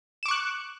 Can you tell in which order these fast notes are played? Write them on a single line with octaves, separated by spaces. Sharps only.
E7 D6 C#6 F#6